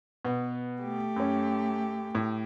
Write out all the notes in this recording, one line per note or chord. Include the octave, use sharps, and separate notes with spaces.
B2 B3
A3 G4
F#2 C#4
A2